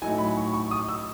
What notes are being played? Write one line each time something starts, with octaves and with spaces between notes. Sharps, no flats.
A2 F#3 A3 D#4 G#5
B5
C#6
C#6
D#6
E6